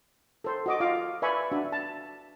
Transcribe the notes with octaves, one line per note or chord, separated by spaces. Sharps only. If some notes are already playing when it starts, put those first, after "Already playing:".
A4 C5
F#4 D#5 D6
F4 D#5 F5 D6
B4 D5 E5 G#5 B5 C#6
D4 F#4 E5
A5